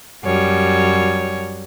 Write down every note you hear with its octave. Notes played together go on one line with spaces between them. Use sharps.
F#2 G3 C#5